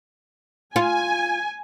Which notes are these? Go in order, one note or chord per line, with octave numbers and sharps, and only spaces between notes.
F4 G#5